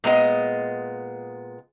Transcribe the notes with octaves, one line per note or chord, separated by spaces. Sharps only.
A#2 G#3 B3 D#5